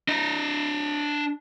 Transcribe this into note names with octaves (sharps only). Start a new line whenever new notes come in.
D4 D#5